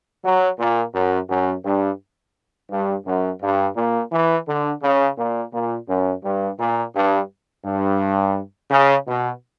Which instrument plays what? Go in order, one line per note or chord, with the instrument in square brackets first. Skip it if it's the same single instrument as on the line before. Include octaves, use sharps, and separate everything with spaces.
[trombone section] F#3
A#2
F#2
F#2
G2
G2
F#2
G2
A#2
E3
D3
C#3
A#2
A#2
F#2
G2
A#2
G2
G2
C#3
B2